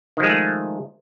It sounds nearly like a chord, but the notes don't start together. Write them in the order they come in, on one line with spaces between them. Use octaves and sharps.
D#3 F3 G#3 G#4 A3